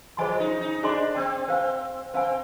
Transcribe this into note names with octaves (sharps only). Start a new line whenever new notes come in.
F3 G#4 C5 D#5 G#5 C6
D#4
D#4
D4 G#4 C5 D#5 G#5 C6
C4
C4 C5 F5 G#5
C4 C5 F5 G#5